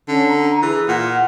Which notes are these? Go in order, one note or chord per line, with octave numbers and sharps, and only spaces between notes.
D3 C#4
A#5
E3 G#4
A#2 F#5